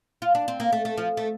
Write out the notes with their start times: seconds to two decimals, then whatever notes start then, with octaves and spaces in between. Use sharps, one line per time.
0.22 F4
0.35 D4
0.48 C4
0.60 A#3
0.73 A3
0.85 A3
0.98 F3
1.17 A3